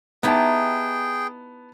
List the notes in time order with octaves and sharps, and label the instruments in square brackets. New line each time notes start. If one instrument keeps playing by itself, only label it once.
[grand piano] B3 A5 [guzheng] D#4 E4 G4 [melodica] G#4 G5